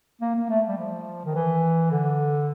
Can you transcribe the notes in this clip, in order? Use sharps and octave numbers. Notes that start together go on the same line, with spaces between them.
A#3
A#3
A3
G3
F3
D#3
E3
D3